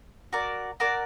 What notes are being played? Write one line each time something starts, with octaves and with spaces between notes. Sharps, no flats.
F#4 A#4 D5
F#4 A#4 D5